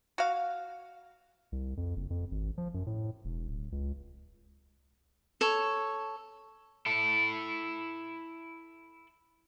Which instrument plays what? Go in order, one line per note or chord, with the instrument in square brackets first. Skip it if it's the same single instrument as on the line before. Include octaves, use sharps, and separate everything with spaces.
[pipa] F#4 F5
[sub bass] C2
F2
F#1
F2
G#1
F3
F#2
A2
E1
D1
C#2
[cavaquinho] A4 C#5
[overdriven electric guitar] E4 A4